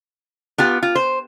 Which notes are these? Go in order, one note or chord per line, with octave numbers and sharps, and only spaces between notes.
B3 F4 G4
F4
C5